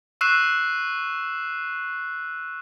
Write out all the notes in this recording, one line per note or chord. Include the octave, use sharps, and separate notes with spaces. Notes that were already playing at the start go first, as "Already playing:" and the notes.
C#6 E6 F#6 C7 E7